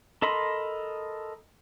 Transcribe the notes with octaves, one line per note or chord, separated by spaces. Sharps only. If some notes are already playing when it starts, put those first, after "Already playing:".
A4 A#4 D#5 B5 C6